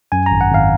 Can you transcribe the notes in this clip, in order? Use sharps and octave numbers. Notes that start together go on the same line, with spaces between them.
F#2 G#5
G#1 A#5
F#5
G#1 F5